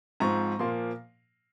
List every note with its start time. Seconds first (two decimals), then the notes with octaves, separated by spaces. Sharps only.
0.20 G#2 F3 C4 A#5 C#6
0.59 A#2 F3 A#3 C6